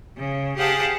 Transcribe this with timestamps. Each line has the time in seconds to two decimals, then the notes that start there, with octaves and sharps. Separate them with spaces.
0.17 C#3
0.56 G4 G#4 C5 F5 F#5 A5